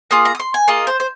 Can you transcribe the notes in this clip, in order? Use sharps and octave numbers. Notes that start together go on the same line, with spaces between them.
A#3 F4 G#4 D#6
A#5
D#6
C6
G#5
A#3 F4 G#4 D#5
C5
C5